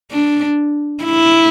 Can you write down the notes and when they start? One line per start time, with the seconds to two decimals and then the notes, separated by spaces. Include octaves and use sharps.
0.11 D4
1.04 E4